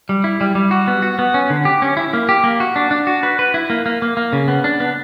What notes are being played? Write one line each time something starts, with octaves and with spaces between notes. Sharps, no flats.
G3
E4
G3
G3
F#4
B3
F#4
B3
C#4
D3
G4
C#4
E4
A#3
G4
A#3
F#4
D4
D4
F#4
B4
B4
E4
A#3
A#3
A#3
A#3
C#3
B3
D4
B3